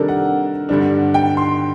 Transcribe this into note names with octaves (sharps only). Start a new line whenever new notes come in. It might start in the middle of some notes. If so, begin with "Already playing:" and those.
Already playing: C3 D#3 G3 D4 A4 A#4
F#5
G2 D3 G3 D4
G5
C6